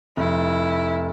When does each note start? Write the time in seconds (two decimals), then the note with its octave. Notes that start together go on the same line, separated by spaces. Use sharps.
0.17 F1 E4